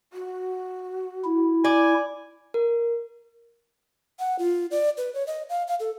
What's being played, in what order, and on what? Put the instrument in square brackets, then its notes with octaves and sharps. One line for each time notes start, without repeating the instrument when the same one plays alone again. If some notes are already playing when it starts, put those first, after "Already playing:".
[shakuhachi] F#4
[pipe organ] E4
[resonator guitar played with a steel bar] D5 [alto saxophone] G#5
[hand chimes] A#4
[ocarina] F#5
F4
D5
B4
C#5
D#5
F5
F5
A4